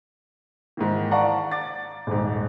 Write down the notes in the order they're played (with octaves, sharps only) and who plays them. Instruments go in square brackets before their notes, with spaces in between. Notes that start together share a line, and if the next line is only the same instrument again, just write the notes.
[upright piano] G#2 D#3 E3
D5 F5 F#5 A5 A#5 C#6
D6 A6
D#1 G#2